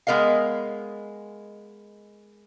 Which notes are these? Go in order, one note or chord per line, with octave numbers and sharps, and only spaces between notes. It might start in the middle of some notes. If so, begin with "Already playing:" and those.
G#3 B3 A#4 D#5 F5